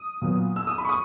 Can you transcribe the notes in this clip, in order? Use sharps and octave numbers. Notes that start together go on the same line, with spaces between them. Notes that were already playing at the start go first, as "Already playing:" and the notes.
Already playing: D#6
A#2 F#3 B3
E6
D#6
B5
C#6
D#6